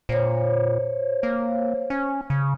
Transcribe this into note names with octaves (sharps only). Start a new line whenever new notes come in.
A#2 C5 C#5
A#3
C#4
C#3